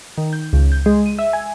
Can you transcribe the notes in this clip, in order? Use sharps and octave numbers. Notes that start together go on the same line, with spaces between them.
D#3
G6
C#2
G6
G#3
D#7
E5
G#5